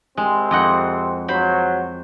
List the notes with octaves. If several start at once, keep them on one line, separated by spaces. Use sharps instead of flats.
C2 G#3 C4
F2 D#5 F#5
F#3 C5 B5